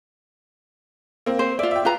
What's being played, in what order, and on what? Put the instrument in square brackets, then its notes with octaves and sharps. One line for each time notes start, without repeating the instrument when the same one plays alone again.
[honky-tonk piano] A#3 C4
[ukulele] C5
[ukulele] F4 D5 [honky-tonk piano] E5
[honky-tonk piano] E5 G5
[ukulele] F4 B4 A#5